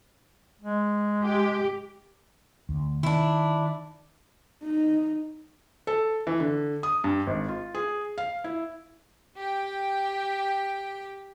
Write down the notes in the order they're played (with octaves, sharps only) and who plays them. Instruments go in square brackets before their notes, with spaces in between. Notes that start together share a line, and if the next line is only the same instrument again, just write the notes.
[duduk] G#3
[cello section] G4
[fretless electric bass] D2
[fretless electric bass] D#3 [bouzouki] D4 E4
[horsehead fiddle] D#4
[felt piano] A4
E3
D3
D#6
G2
G#1
F4
G#4
F5
E4
[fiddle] G4 G5